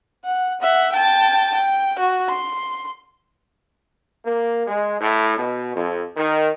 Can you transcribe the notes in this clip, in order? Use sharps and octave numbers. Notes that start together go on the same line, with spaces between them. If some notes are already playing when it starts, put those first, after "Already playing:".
F#5
E5 F#5
G5 A5
G5
F#4
C6
A#3
G#3
A2
B2
F2
D#3